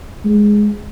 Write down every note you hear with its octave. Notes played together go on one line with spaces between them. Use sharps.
G#3